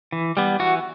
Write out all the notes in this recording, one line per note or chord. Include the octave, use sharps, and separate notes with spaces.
E3
G3 B3
E3 F#4